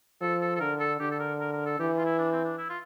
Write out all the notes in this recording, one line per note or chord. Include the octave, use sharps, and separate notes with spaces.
F3 A4
A4
A4
D3 A#4
A4
D3 G4
A4
A#4
A#4
A#4
A4
E3 G4
F4
E4
D4
C4
D4
E4
F4